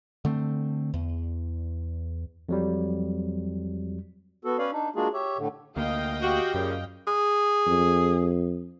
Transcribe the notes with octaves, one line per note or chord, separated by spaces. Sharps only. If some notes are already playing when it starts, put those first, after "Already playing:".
D3 A3 C4
E2
F2 F#3 G3
B3 F#4 A4
C#4 B4 C#5 D5 F5
D4 D#4
G#3 A#3 D4 F4 F#4 G#4
G4 C#5 E5
A2 D3
D2 A#3 D#5 F5 G5
F#4 G4
F#2 A#2 C#3
G#4
F2